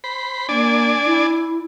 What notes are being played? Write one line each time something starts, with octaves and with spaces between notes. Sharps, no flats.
C5 B5
A#3 D4 D5 G#5
E4